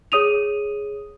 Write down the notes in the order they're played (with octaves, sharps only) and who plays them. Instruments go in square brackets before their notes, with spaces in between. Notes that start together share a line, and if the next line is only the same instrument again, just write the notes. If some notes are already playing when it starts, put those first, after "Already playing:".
[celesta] G#4 C#5 D#6 D#7 F7